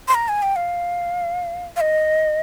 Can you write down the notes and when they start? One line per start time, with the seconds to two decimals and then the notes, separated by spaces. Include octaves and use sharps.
0.08 C6
0.14 A#5
0.28 G#5
0.42 G5
0.56 F5
1.76 F5
1.81 D#5